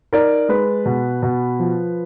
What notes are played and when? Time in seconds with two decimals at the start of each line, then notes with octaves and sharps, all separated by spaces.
0.13 D#4 A#4 D5
0.49 G#3 B4
0.86 B2
1.23 B2
1.59 F3